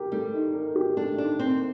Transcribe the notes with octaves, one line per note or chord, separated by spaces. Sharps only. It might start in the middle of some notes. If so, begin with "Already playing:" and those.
Already playing: G4 A#4
G3 A3
D#4
A#4
G4
A3 D4
D4 D#4
C4 A#4